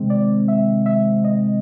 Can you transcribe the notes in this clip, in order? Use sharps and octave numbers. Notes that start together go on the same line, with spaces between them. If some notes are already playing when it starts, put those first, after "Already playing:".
Already playing: C3 D#3 G#3 C4
D5
E5
E5
D#5